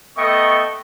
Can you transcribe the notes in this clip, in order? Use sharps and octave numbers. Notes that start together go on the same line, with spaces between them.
A3 B3 D#5 G5 C#6